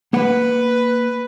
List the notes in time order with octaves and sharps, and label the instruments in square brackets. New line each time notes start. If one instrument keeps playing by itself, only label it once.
[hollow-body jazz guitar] A#3 F#5 [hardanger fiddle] B4